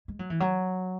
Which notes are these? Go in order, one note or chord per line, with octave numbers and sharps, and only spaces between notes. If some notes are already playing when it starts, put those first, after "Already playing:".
G#3
F#3
E3
F#3